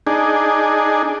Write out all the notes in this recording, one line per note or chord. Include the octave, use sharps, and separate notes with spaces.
D4 D#4 G#4